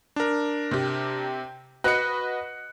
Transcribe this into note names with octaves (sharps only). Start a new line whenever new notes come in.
D4 A#4
C3 G4
F#4 B4 D#5 F#6 C#7